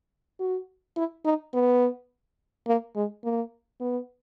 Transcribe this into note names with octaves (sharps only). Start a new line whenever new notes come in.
F#4
E4
D#4
B3
A#3
G#3
A#3
B3